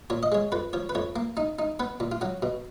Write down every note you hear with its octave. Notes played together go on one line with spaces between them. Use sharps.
A#2 C#5
D#5
G#3 C#5
F2 B4
F3 C#5
B4
F2 C#5
A#3
D#4
D#4
B3 B4
A#2
F4
F#3 F#4
B2